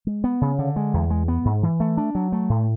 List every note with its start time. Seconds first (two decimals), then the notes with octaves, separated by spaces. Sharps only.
0.07 G#3
0.24 B3
0.41 C#3
0.59 D3
0.76 G#3
0.94 E2
1.10 G#3
1.28 B3
1.45 G#2
1.63 E3
1.80 A3
1.97 D4
2.15 F#3
2.32 A3
2.49 A2